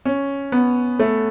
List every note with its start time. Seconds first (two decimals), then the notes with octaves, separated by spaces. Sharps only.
0.05 C#4
0.52 B3
0.99 A3